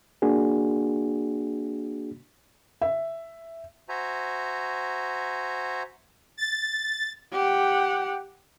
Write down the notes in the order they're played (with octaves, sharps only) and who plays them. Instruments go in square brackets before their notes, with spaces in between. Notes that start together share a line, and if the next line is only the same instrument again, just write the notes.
[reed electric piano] A#3 D4 F#4 G#4
[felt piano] E5
[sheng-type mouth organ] F#4 C5 E5 G#5 A#5
[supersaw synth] A6
[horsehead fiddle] G4 F#5